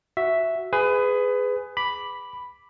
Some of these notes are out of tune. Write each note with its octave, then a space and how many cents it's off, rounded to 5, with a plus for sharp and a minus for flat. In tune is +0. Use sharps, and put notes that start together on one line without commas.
F#4 +0 E5 +0
G#4 +0 B4 +25
B5 +0 D6 +0